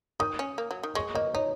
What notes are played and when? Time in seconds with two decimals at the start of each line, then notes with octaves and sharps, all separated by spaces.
0.20 D#3 D#6
0.39 C#4
0.58 A#3
0.71 F#3
0.83 D#3
0.95 G#3 C#6
1.15 A#3 D#5
1.34 D#4 C#5